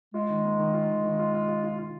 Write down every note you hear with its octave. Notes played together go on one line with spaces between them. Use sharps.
G#3 F4
D#3
A#3
D#3
F4
D#3
D#3
F4
F4
F4
F4
F4